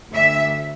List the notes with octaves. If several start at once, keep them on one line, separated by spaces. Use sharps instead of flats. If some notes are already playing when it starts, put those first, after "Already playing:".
D2 E5